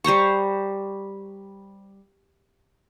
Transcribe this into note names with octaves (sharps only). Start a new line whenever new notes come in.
G3 C5 A#5 C#6